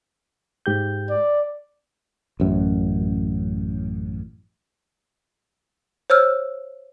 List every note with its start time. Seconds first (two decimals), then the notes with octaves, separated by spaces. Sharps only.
0.66 G#2 G4 G6
1.10 D5
2.40 A1 F#2
6.10 C5 C#5 E6 F6